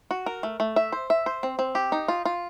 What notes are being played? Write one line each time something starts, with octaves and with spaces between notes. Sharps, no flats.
F#4
A#4
A3
A3
E5
C5
E5
C5
C4
C4
G4
D#4
F4
F4